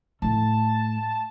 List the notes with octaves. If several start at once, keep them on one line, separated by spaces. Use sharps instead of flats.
A2 A3 A5